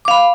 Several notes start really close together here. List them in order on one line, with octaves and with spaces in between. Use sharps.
D6 F5 B5